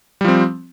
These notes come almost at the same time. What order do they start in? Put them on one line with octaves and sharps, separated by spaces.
G3 F3 C4